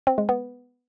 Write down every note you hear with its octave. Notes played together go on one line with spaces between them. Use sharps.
C4
G#3
B3